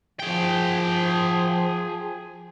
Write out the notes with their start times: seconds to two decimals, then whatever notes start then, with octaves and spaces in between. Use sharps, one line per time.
0.19 F3 G#4 G5